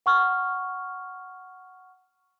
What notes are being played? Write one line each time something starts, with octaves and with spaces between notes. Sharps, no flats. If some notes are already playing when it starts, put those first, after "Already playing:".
F#5 C#6 F6